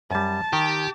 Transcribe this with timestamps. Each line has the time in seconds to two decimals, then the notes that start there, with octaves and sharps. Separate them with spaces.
0.11 F#2 G3 A5
0.53 D#3 G4